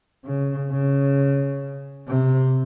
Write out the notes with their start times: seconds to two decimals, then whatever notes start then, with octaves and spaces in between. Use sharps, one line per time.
0.25 C#3
0.71 C#3
2.07 C3